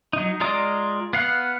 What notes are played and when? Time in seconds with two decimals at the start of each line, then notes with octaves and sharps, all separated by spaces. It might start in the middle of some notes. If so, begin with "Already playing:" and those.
0.13 F#3 D#4
0.40 G#3 F4 D5 A#5 D#6
1.13 B3 F5 F#5